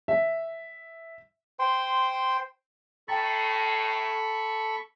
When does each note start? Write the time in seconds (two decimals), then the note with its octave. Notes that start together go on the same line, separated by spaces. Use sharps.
0.08 E5
1.59 C5 G5 C6
3.08 A2 A4 G5 A#5 B5 C#6 A6